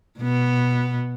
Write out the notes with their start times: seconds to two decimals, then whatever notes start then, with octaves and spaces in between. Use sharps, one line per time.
0.20 B2 B3